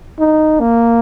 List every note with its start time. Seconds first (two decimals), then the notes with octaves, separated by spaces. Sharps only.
0.19 D#4
0.60 A#3